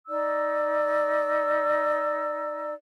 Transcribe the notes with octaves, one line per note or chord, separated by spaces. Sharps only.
D#4 D5 E6